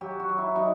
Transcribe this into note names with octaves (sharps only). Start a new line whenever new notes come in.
F#3 G4
F#4
F#3
E4
F#3 D#4